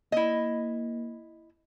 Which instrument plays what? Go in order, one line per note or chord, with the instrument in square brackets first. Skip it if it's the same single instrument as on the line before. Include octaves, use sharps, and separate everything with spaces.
[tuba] A#3 [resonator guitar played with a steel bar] E4 D#5